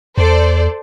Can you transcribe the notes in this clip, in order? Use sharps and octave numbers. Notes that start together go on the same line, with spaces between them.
E2 A4 C5 D5